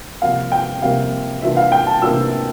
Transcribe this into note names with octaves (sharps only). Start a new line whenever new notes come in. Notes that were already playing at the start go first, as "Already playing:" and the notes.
C3 F3 A#3 F5
G5
C3 F3 A#3 F5
C3 E3 A#3 D4 F4 E5
F5
G5
A5
C3 E3 A#3 D4 F4 E6